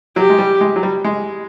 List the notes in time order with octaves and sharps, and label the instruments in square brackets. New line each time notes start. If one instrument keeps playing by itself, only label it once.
[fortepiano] F#3 [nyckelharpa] G4
[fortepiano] G#3
G3
G#3
F#3
G3
G#3